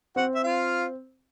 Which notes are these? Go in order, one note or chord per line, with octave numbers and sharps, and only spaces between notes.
C4 F#4 F#5
E5
F4 F5